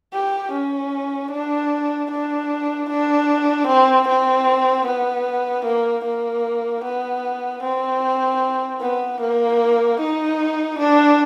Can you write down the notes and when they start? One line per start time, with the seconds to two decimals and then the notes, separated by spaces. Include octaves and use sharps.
0.13 G4
0.52 C#4
1.31 D4
2.11 D4
2.90 D4
3.67 C4
4.08 C4
4.86 B3
5.65 A#3
6.05 A#3
6.84 B3
7.63 C4
8.81 B3
9.21 A#3
10.00 D#4
10.79 D4